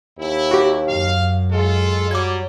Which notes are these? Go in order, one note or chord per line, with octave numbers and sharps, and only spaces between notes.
D#2 E4
F#4 G4
F#2 F5
G#3 F4 A4
F#3 G3 D6 G#6